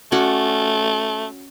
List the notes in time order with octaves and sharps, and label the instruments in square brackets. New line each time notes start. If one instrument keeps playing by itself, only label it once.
[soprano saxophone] A3 [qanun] C#4 F#4 D5